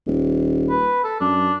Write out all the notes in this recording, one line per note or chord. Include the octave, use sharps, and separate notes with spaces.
D#1
B4
A4
F#2 D4